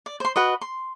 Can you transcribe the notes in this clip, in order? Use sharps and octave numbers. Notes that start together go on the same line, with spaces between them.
D5
C5 C6
F#4 B4 D#5
C6